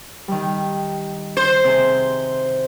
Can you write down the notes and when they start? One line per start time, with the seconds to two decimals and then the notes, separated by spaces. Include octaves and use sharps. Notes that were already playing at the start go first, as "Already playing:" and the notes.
0.28 D#3 G3
1.37 C5
1.64 C3 C4 G#4